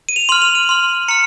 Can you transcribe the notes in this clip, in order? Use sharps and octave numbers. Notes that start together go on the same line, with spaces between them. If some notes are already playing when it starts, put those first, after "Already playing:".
D#7
F7
C6 F6 F#7
F7
D#7
C6 F6
A#5 F6 C#7